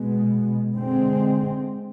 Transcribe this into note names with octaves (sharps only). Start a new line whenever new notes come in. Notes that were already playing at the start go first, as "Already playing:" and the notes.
Already playing: B2 G#3 B3
D3 G#3 C4